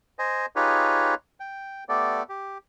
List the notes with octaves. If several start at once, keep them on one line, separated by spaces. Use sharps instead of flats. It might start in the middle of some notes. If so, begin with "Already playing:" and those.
C5 D#5 G#5
D#4 F4 G4 G#4 B4 C#5
G5
A3 B3 G4 A4 D5
G4